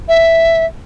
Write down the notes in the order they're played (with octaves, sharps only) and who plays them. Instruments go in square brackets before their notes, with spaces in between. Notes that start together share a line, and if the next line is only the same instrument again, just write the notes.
[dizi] E5